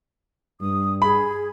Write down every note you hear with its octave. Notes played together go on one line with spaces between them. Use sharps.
G2 D#6
G#4 B5